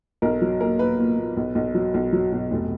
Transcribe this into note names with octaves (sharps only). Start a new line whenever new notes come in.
B1 A#4
F#3
A#3 A#4
A#3 B4
A#2
A#2
B1
B1
F#3
B1
F#3
B2
F1